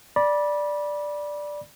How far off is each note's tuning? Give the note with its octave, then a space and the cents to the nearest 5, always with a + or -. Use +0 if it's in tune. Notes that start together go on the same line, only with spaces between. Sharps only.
D5 +0 B5 -30